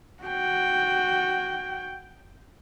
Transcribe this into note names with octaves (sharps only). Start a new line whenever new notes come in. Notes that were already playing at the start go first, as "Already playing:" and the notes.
F#4 G5